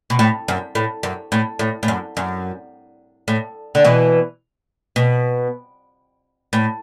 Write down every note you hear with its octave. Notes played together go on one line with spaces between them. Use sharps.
B2
A2
F#2
A2
F#2
A2
A2
A2
F#2
F#2
A2
D3
B2 E3
B2
A2